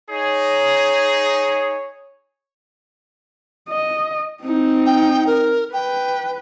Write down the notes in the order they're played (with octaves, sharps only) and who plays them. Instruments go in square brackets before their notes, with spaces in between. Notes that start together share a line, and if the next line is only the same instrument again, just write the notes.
[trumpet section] D#4 G#4 [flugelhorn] C#5
[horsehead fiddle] D#5
C4 D#4
[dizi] G5
A#4
[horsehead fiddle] B4 [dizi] G5